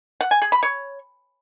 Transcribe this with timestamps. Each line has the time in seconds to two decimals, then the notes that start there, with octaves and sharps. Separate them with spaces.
0.21 F#5
0.31 G#5
0.42 G#4
0.52 B5
0.63 C#5